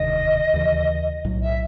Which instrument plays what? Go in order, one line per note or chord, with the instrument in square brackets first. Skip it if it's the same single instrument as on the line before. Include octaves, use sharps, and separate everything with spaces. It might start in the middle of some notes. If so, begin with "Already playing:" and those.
Already playing: [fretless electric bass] E1 D2 C3 D#3 [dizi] D#5
[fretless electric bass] D#2 C#3 E3
B1 A2 F#3
[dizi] E5